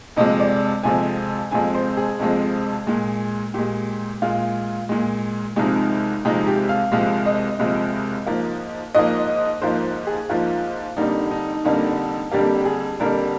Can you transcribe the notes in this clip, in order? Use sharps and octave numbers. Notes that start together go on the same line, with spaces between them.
F2 C3 F3 G#3 D#5
D5
F2 C3 F3 G#3 G#5
F2 C3 F3 G#3 G#5
C5
G#4
F2 C3 F3 G#3
A#2 G#3
A#2 G#3 G4
A#2 G#3 F4
A#2 G#3
C2 C3 F3 G#3 D#4
C2 C3 F3 G#3 D#4
G4
F5
C2 C3 F3 G#3 F5
D#5
C2 C3 F3 G#3
G#2 F3 A#3
G#2 F3 A#3 D#5
G#2 F3 A#3 C5
G#4
G#2 F3 A#3 F4
F2 D3 G3 A#3 D#4
D#4
F2 D3 G3 A#3
F2 D3 G3 A#3 G4
G#4
F2 D3 G3 A#3 A#4